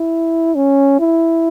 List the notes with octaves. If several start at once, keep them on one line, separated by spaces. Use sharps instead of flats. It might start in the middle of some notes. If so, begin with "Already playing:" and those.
Already playing: E4
C#4
E4